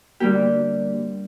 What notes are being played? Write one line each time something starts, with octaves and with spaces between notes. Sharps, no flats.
D3 G3 A#3 G4